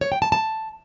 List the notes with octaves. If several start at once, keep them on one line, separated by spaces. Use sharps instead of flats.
C#5
G5
A5
A5